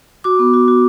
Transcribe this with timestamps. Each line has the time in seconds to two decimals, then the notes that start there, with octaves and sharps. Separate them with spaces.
0.24 F#4 D6
0.39 B3
0.54 F#4
0.68 F#4